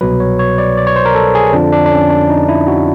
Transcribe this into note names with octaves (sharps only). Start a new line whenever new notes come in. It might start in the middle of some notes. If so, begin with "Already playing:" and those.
C2 B2 F#3 B4
C#5
C#5
D5
D5
C#5
C5
A#4
A4
G#4
F2 D3 F3 D4
D4
D4
C#4
D4
D#4
E4
F#4